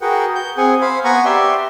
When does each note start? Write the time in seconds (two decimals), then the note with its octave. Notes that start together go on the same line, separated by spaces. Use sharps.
0.01 F#4 G#4 A#4 B4 F#5 G5
0.35 G6
0.57 C4 G#4 F#5 G#5
0.81 C5 F5 B5
1.04 B3 F#5 G#5 A#5 B5 C#6
1.25 G4 D5 E5 C6